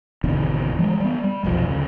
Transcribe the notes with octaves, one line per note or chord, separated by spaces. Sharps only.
G#1 E2 B2 D3
E3 F3 G#3
G3 B3
G3
F1 B1 A2 F3
D2 C#3